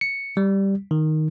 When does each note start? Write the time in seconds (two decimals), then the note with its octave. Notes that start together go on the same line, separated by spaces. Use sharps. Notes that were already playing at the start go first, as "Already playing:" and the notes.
0.01 C#7
0.37 G3
0.91 D#3